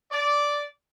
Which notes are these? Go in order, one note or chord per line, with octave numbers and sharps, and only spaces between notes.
D5